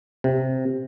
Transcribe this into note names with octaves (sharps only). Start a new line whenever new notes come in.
C3